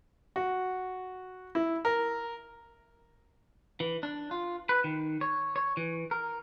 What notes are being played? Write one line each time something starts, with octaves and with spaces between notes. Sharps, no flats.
F#4
E4
A#4
E3
D4
F4
B4
D#3
C#5
C#5
E3
A#4